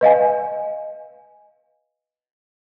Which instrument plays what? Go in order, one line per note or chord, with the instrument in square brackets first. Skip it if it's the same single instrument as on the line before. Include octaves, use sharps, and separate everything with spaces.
[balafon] B4 D#5 F5 G#5